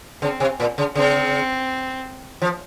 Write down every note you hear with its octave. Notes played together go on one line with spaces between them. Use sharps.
C#3 C4
C3
A#2
C#3
C#3 C4
F3